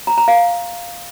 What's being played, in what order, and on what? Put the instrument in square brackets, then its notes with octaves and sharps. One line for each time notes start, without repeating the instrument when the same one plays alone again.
[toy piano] A#5
A#5
F5